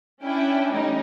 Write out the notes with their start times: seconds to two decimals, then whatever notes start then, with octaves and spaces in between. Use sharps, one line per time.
0.23 C#4 D4 E4 G5
0.70 E3 G3 A3 C#4 D#4